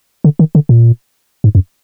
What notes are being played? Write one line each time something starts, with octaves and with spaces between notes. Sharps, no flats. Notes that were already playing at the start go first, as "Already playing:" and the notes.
D3
D#3
D3
A#2
G#2
F#2